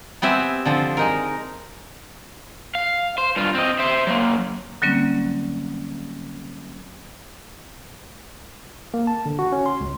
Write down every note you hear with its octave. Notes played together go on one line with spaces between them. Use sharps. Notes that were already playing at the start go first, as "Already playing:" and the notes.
B3 C4 G4 E5 G#5
D3 F3 C4
G#3 D#4 A#4
F5
C5
G2 F4
C4 D#5
C5 E5
F#3 A#3
D3 F#3 G3 A#3 C4 C#4
A#3
A5
D3
F#4
C#4
C6
C#2